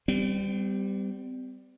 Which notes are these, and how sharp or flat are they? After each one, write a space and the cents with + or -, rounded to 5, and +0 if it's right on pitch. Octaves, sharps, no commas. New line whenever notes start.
G3 +0 C4 -45